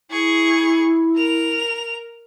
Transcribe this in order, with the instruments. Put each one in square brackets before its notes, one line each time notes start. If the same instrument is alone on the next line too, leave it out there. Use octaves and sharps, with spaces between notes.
[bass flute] E4 [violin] G#4 C#6
[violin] A#4 F7